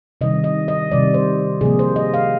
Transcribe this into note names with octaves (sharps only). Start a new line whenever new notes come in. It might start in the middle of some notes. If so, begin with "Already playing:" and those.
C3 D#3 G3 D#5
D#5
D#5
C3 D#3 G3 D5
C5
C3 F3 A#3 G#4
C5
D#5
F5